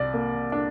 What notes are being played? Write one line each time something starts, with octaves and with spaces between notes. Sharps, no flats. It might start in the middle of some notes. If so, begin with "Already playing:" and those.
Already playing: C2 D5
A#3
D4